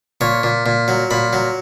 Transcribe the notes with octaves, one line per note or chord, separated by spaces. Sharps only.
A#2 C#5
A#2
A#2
F#3
A#2 B5
F#3